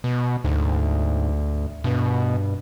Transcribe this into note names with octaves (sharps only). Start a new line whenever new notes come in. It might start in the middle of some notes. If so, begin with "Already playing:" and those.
B2
D2 G#2
G2 B2